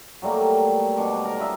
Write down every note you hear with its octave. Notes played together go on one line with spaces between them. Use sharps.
F#3 G3 A3 A#3
B2 D4 C#6 D6
A#4
D4 F4 D#5 E5